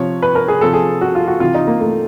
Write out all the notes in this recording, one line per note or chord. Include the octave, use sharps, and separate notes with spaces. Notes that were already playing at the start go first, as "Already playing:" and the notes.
Already playing: C3 F3 C#5
B4
A#4
G#4
C3 F3 A4
G#4
F#4
F4
F#4
C3 E3 F4
D#4
A#3
A3